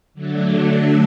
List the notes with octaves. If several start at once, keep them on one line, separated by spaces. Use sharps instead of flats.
D3 F#3 A3 D4